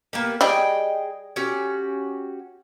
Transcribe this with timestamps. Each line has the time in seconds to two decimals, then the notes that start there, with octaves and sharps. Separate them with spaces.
0.13 A#3 B3 G4
0.41 G3 G#4 D#5 G5
1.36 C#4 F#4 G4